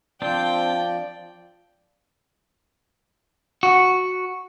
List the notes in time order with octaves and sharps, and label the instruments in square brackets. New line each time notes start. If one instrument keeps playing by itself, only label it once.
[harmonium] F3 D5 [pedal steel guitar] C4 D4 F4 [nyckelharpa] G5
[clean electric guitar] F#4